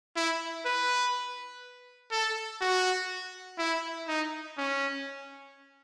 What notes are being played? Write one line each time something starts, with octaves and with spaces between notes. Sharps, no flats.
E4
B4
A4
F#4
E4
D#4
C#4